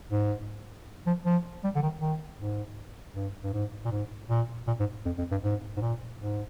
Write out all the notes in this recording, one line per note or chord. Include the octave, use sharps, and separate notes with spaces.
G#2
F3
F3
G3
D3
D#3
D#3
G#2
G2
G2
G#2
A#2
G#2
A#2
A#2
G#2
F2
F2
G2
G#2
G#2
A#2
G#2